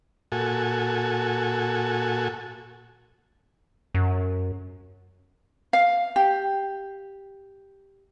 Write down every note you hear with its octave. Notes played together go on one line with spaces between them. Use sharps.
A#2 F#4 A4 G#5
F#2
F5
G4